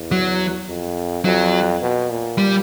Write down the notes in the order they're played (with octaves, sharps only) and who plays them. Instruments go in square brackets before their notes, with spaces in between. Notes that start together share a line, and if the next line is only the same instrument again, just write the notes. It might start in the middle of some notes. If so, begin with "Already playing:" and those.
Already playing: [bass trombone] E2
[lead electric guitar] F#3
[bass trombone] F2
[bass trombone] F2 [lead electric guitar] F#3
[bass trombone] B2
A#2
[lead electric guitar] G3